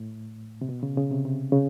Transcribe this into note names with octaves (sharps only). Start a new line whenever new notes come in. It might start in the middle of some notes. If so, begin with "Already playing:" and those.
Already playing: A2
C3
B2
C#3
C#3
C3
C3
C#3